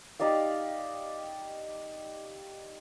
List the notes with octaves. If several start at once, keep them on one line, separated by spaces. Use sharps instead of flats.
D#4 G4 D5 F5